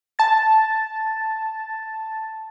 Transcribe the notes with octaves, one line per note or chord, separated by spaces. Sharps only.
A5 A6